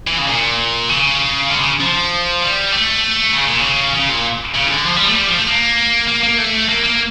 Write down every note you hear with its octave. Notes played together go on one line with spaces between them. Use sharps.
E3
C#3
A#2
C#3
D3
C#3
F3
G3
A3
C#3
A#2
C#3
C#3
A#2
C#3
E3
D3
F3
G3
A3
G3
F3
A3
A#3
A#3
A#3
A3
A#3
A#3